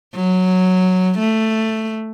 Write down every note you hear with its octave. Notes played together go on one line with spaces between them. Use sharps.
F#3
A3